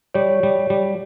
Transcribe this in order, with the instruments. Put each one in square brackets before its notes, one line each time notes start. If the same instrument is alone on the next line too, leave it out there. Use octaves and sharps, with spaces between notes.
[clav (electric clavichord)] G3 [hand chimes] C#5
[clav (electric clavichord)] G3
G3